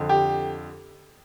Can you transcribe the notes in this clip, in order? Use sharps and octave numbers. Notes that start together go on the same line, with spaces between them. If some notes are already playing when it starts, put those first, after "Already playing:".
Already playing: F2 D3
G4